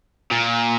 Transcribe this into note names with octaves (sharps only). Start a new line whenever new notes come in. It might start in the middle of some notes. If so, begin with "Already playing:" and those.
A#2